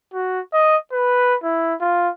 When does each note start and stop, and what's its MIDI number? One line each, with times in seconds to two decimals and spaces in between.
0.14 0.40 66
0.53 0.77 75
0.92 1.35 71
1.43 1.74 64
1.81 2.09 65